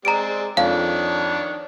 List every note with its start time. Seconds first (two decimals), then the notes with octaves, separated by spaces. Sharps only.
0.05 G#3 C4 D5 A#5 D7
0.57 F2 D#3 D4 C#5 F5